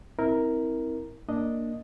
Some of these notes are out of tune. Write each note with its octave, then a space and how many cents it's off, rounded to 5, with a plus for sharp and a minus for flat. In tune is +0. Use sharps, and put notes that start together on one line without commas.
C4 +0 E4 -30 A#4 +0
A#3 +0 D4 +0 D#5 +0